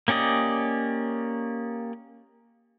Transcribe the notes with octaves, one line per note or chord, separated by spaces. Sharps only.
A#3 C#4 G4 D5 D#5